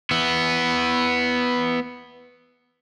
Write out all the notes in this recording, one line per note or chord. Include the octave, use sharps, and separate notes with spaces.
B3 E4